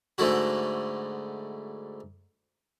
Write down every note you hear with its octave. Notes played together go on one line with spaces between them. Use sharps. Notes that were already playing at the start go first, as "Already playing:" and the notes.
G#2 D3 A3 D4 E4 F#4